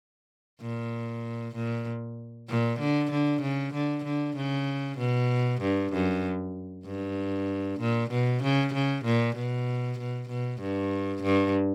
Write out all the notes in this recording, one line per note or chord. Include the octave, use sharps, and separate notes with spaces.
A#2
A#2
A#2
D3
D3
C#3
D3
D3
C#3
B2
G2
F#2
G2
A#2
B2
C#3
C#3
A#2
B2
B2
B2
G2
G2